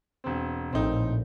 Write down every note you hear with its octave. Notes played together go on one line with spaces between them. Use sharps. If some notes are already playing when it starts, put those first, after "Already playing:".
E1 C4
A#1 A2 C4 D#4